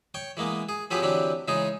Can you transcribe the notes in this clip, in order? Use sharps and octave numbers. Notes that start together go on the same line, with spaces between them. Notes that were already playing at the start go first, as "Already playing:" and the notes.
C#5 G5 C#6
E3 G#3 A#3 B3
G#4
F3 F#3 C4 G4 G#4 B4
D3 E3 F#3 C4 D4 G4
C#3 E3 G#3 D#4 G#4